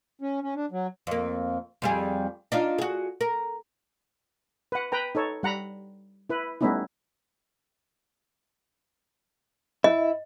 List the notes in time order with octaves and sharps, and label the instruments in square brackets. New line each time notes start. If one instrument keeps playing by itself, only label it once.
[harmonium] C#4
C#4
D4
F#3
[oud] F2 A#3
F2 G3 G#4
D4 D#4 F4
F#4 G#4
A#4
[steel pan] B4 F#5
B4 G5 A#5
D#4 A4 C#5
G3 F#5 A#5 B5
E4 B4
G3 A3 B3 C#4 D#4 E4
[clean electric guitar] E4 [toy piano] D#5